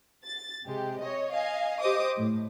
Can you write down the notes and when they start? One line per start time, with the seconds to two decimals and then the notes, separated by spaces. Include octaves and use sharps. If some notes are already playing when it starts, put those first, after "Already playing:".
0.25 A6
0.66 C3 G#3 G4
1.00 C#5 D#5
1.32 D#5 F5 G#5
1.80 G4 C5 D#5 D6 D#6
2.17 A2